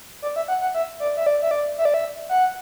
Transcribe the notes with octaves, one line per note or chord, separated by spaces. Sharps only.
D5
E5
F#5
F#5
E5
D5
E5
D5
E5
D5
E5
D5
E5
F#5